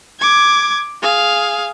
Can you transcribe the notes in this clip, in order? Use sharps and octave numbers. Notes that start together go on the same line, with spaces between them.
D6 G#6
G#4 F5